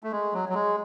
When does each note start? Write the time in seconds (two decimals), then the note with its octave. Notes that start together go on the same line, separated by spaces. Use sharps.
0.03 A3
0.12 G#3
0.33 F#3
0.49 F#3
0.54 G#3